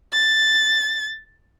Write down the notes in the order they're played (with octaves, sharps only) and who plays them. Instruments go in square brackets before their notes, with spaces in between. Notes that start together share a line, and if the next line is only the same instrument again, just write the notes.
[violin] A6